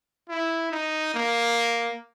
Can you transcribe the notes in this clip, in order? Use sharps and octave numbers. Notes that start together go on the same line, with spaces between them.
E4
D#4
A#3